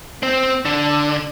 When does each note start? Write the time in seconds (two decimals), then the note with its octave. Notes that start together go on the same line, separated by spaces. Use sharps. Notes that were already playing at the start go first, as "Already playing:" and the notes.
0.23 C4
0.65 D3